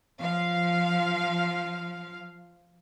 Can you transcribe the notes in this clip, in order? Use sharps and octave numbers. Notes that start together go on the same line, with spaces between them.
F3 F5